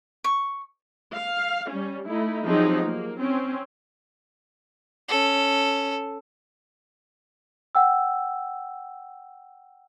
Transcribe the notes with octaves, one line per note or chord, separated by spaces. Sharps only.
C#6
F5
G3 C#4
A3 D#4 E4
F3 F#3 C4 D#4 G4 G#4
A#3
C4 C#4
C#4 A4
F#5 G5 E6